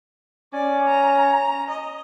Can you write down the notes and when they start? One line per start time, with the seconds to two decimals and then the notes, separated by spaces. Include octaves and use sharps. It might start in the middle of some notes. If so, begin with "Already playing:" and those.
0.53 C#4 D5
0.86 A#5
1.70 D#5